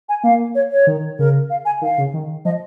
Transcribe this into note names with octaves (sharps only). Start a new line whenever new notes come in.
G#5
A#3 F5
C#5
C#5
D#3
C#3 A#4
F5
G#5
D#3 F5
C#3
D#3
F3 D#5